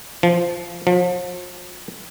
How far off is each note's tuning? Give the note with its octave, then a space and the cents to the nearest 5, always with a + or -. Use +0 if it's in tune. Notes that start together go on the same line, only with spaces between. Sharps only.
F3 -10
F3 +40